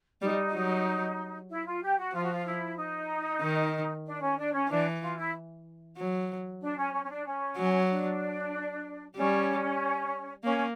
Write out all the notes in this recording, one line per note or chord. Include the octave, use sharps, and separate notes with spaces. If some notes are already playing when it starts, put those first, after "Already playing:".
G3 D#4
F#3
E4
F4
G4
F#4
F3 F4
F#4
F4
E4
D#4
D#3
D4
C#4
D4
C#4
E3 D4
F4
E4
F#3
D4
C#4
C#4
C#4
D4
C#4
F#3
D4
G3 C#4
A#3 C#4